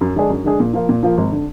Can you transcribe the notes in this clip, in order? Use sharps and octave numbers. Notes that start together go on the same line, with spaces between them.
F#2
D3 G#3 D4 G#4
F#2
D3 G#3 D4 G#4
A#2
F3 A#3 F4
A#2
F3 A#3 F4
G#1
D3